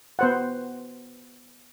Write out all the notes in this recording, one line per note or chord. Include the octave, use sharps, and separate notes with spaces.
B3 C5 F#5